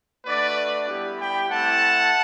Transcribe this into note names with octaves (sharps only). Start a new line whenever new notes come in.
A3 D4 F#4 B4 D5
G3 B3 E4 G4
G5 B5
A3 C4 E4 F#5 A5